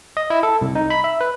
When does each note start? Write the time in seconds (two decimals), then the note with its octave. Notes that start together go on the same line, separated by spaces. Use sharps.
0.17 D#5
0.30 E4
0.43 A4
0.61 C2
0.75 D#4
0.90 B5
1.04 E5
1.21 B4